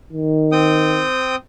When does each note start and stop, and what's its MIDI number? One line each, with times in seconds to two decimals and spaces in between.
0.13 1.05 51
0.52 1.36 60
0.52 1.36 79
0.52 1.36 87